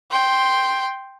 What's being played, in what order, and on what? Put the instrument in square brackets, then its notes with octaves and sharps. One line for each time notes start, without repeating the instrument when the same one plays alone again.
[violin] G5 C6